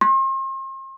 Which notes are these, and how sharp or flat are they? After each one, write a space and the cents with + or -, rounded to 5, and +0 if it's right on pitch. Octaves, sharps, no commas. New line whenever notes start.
C6 +40